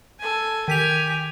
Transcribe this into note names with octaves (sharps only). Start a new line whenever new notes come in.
A4 G#5
D#3 G4 G#5 B6 F7